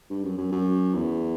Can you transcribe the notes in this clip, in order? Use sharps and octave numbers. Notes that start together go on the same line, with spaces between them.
G2
F#2
F#2
F#2
E2